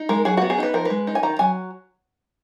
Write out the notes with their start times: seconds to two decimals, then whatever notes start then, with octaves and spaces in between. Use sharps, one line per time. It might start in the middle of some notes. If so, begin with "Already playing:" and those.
Already playing: D#4
0.09 G#3 A#4
0.25 F#3 G#4
0.37 F#4
0.42 B3
0.50 G#4
0.58 D#4 B4
0.74 F3 A#4
0.85 G#3 B4
1.07 D#4
1.15 G#5
1.23 D#3 A#5
1.39 F#3 G#5